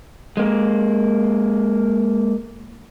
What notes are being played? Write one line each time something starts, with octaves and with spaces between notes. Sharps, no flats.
G#3 A#3